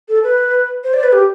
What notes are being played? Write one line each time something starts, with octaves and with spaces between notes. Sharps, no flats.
A4
B4
C5
D5
B4
G4